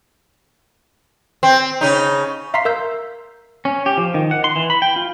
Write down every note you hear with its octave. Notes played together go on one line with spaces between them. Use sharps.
C4
C#3 D#4
E5 F5 A#5 C6 B6 C7
A#4 E5 E6 G6
C#4
G4
F3
D#3
F#5
C6
E3
B5
G5
F4